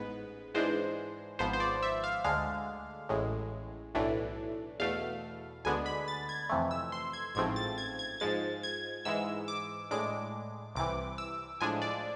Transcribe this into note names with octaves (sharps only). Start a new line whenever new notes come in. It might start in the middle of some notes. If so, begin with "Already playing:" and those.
Already playing: A1 G#2 G#3 B3 B4
G#2 E3 G#3 D4 C5
G#1 G#2 F3 B3 C5
C5
D5
E5
F5
D2 D3 G#3 D4 F5
A1 A2 G#3
B1 A2 E3 A3 D4
E2 B2 A3 F5
D2 D3 G#3 B3 D4 G#5
B5
A6
G#6
F2 C3 E3 A3
E6
C6
G#6
A1 G#2 F3 A3 C4 G#6
A6
G#6
G#6
G#2 F3 G#3 A6
G#6
G#2 E3 G#3 E6
D6
A2 G#3 D4 D6
C2 C3 E3 D6
E6
A2 F3 G#3 D4 G#5
D5